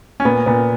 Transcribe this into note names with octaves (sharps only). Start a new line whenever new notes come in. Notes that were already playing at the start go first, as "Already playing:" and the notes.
C#4
A#2 B3
A#2 B3